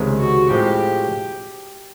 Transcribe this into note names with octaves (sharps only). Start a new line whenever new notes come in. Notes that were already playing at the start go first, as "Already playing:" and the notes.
Already playing: C#2 C3 D#3 G#3
F#4
A2 F3 G#3 C4 G4